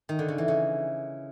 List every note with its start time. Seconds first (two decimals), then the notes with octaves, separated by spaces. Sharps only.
0.09 D#3
0.19 D3
0.28 C#3
0.38 E3
0.48 C#3